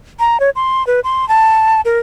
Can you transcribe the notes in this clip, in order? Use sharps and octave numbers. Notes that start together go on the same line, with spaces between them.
A#5
C#5
C6
B4
C6
A5
A#4